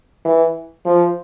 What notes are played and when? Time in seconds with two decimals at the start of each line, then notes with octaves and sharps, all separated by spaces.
0.25 E3
0.85 F3